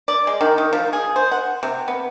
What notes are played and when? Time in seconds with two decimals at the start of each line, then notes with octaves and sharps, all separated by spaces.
0.08 D5
0.27 G#3
0.41 D#3
0.58 D#3
0.73 F3
0.93 G#4
1.16 C5
1.31 F#5
1.63 C3
1.88 B3